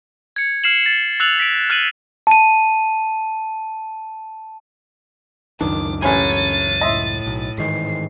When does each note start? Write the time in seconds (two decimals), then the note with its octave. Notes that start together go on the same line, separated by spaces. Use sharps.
0.36 G#6 C#7
0.64 F6 C7 E7 F#7
0.86 A6
1.20 E6 F#6 A6 F7 F#7
1.39 B6 D7
1.70 F6 F#6 A6 D#7 F#7
2.27 A5 D#7
5.61 C#2 F#2 D#3 D4 D6
6.02 A1 C#5 G#5 A6 D#7
6.81 A2 D#5 E5 C6
7.26 B1
7.58 G#2 D#3 E3 C7